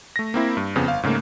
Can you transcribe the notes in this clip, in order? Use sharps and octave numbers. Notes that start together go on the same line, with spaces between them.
A3 A#6
A#3 C4 E4
G2
F2 C#3 B3
G1 F5
G#2 C#3 A3 A#3